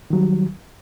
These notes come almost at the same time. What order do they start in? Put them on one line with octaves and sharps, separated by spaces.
D#3 F#3 G3